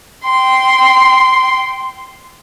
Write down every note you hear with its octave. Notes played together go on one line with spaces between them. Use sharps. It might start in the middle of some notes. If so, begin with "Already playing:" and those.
G5 C6